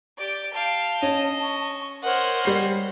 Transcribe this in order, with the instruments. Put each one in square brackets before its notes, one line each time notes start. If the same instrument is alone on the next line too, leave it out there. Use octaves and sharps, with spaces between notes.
[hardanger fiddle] G4 D5
[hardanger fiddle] F5 G5 [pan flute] A5
[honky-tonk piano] C#4 [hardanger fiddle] D#5
[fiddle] C#6
[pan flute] A#4 [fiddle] C5 F#5 [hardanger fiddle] C#5 D#5
[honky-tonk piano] G3 C7